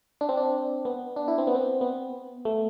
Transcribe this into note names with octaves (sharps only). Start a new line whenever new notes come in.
D4
C4
D4
B3
D4
E4
C4
B3
C4
B3
A3